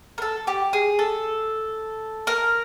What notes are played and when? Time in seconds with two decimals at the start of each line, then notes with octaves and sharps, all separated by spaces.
0.18 A#4
0.22 A4
0.47 G4
0.73 G#4
0.99 A4
2.27 A#4